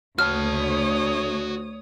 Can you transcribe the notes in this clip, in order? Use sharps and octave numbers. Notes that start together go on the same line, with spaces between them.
D2 F#4 C#5 A5 D#6 F6